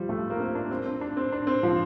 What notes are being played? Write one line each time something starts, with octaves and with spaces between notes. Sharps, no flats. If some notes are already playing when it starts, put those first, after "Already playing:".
Already playing: F3 G3
A3
A#3
C4
D4
C4
C4
D4
C4
D4
C4
F3